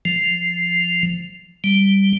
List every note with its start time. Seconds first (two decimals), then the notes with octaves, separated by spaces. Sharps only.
0.05 F3
1.64 G3